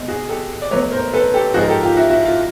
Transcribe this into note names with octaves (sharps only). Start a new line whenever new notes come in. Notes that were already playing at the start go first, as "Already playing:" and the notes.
Already playing: B2 G#3
F#4 G#4
G4 A4
D5
B2 F#3 A3 B4 C#5
A#4 C5
A4 B4
G4 A4
G#2 F3 G#3 F#4 G#4
A#4
G4 A4
F4 G4
E4 F#4
E4 F#4
F4